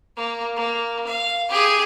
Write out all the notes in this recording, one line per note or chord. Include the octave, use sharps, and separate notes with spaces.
A#3
A#3
F5
G4 G#4